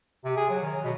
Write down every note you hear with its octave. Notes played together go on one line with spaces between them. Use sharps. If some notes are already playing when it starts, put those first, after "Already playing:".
C3
G#4
F#3
D#3
B2